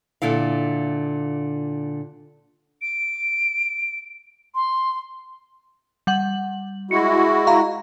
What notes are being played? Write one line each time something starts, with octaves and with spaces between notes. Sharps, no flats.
A#2 D3 E4 F5
D7
C6
G3 F#5 F#7
G#3 E4 F#4 C#7
F5 A#5